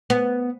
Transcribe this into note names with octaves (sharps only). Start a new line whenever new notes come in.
B3